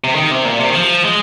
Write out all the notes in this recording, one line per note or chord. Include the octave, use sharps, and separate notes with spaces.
C3
D#3
C3
A#2
C3
D#3
F3
G#3